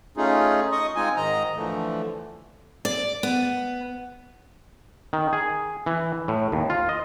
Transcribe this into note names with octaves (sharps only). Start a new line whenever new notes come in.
A3 C#4 D#4 F4 G#4
D#5 C#6 D#6
G#3 C4 D#4 F4 G#5
G#2 D#3 D#5 A#5
D3 E3 F3 A3
D5
B3
D#3
G#4
E3
A2
D#2
F4
D#5